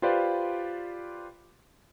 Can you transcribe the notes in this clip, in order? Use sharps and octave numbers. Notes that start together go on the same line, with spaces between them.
F4 G4 B4 C5 D5 F5